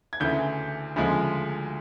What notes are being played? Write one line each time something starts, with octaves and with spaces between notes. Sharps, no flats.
G#6
D2 C#3 E3 G6
D2 C#3 F3 G#3